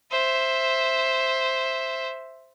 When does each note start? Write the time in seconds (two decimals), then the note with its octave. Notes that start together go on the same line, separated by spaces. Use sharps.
0.11 C5 E5